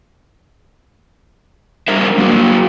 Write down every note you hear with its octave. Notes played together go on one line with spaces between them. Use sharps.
G3 D4 A#4 C5 E5
F#3 A#3 F#4